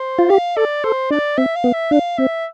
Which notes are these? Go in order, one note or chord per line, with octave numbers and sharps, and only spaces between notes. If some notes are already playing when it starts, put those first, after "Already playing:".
Already playing: C5
F4
G4 F5
A4 D5
A4 C5
D4 D5
C4 E5
F5
B3
E5
D4 F5
C4 E5